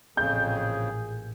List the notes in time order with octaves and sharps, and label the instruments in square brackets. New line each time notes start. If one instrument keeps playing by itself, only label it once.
[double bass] A1 A#2 [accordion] F2 C#3 [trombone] G#4 [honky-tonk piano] G6